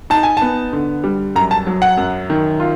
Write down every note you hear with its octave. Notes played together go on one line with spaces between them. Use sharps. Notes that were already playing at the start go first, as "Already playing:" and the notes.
D#4 A5
G#5
B3 A5
D3
G3
F#2 A#5
A5
F#3
F#5
F#2
D#3
F4